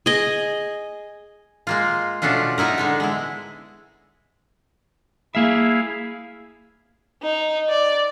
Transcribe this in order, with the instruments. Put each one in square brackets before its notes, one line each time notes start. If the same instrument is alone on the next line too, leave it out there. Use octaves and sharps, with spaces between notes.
[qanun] G#4 D#5
[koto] G#3 A#3 F4
B2 A3 C#4 D4 F4
B3 D#4 E4 A#4
D3 G#3 B3
G#3 E4
[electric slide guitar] A#3 E5 [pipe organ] E4 G#4 F5
[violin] D#4
D5